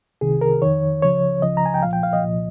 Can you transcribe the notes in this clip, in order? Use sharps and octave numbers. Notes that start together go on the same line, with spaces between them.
C2 C3 D#3 G#4
A#4
F2 D#3 C#5
C#2 C#3 F3 C#5
C#2 C#3 F3 D#5
A#5
G#5
G5
C2 A#2 F3 F5
G5
F5
D#5
C2 A#2 F3